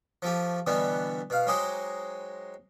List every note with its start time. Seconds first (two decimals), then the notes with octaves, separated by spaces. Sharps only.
0.22 F3 A3 G4
0.67 B2 D3 E3 G3 B3
1.30 B2 F5
1.47 F#3 G#3 D#4 G4 C5 D#5